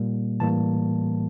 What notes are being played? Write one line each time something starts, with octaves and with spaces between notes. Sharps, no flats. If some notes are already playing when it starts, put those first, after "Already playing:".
Already playing: A#2 G3 A#3
A2 E3 G3 A#3 A5